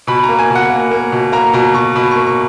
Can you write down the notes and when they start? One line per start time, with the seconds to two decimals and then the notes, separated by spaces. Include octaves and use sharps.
0.07 B2 B5
0.23 A#5
0.29 A#3
0.39 G#5
0.50 B2
0.55 F#5
0.70 A#3
0.91 A#3
1.12 B2
1.32 A#3 A#5
1.53 B2 A#5
1.74 B2 C#6
1.95 B2 B5
2.11 A#3 C#6
2.26 C#6